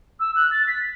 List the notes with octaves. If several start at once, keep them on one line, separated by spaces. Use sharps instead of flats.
E6
F#6
A6
B6